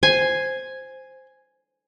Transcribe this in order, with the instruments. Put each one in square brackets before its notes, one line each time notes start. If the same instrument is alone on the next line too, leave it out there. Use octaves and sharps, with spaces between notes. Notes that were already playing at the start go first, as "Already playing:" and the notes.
[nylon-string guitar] C5 [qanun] G#5